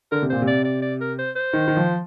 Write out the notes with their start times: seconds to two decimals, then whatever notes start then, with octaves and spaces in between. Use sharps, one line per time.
0.12 D3 A#4
0.22 C3
0.30 A#2 C5
0.42 C3
0.47 D5
0.65 D5
0.82 D5
1.01 A#4
1.18 C5
1.36 C5
1.53 D#3
1.68 D#3
1.77 F3